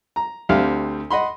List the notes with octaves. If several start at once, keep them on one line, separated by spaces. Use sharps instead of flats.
A#5
D2 G3 C4 E5 F5 F6
D#5 F#5 B5 C6